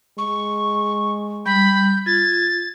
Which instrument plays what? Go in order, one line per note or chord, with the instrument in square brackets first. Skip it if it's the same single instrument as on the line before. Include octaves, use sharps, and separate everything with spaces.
[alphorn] G#3 [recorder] C#6
[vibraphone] G3 [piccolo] B5 [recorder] G6
[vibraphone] F4 [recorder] G#6 [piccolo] A6